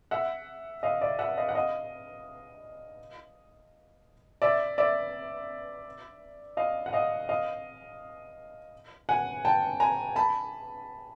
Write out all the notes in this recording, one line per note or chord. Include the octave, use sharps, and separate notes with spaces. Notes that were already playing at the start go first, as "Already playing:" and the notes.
E5 F#5
D#5 F5
D5 E5
E5 F#5
D#5 F5
F#5
D#5 F5
D5 E5
D5 E5
D#5 F5
F#5
D#5 F5
D#5 F5
F#5 G#5
G5 A5
G#5 A#5
A5 B5